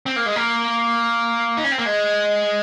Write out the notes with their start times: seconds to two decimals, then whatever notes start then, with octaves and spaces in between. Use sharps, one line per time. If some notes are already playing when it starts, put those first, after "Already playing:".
0.06 C4
0.16 A#3
0.26 G#3
0.36 A#3
1.57 D#4
1.64 C#4
1.72 C4
1.78 A#3
1.86 G#3